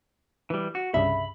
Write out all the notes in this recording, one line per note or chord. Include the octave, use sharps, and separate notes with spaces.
E3 G3
F#4
C2 G2 C#3 E5 B5